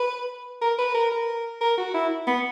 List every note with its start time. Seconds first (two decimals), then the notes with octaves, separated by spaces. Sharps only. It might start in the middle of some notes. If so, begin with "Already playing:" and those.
Already playing: B4
0.61 A#4
0.78 B4
0.95 A#4
1.12 A#4
1.61 A#4
1.78 F#4
1.94 E4
2.27 B3